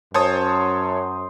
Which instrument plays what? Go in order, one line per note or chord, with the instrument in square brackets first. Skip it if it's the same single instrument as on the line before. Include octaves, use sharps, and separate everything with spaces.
[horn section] F#2 [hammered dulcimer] C5 [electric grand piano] C#5 A5 D#6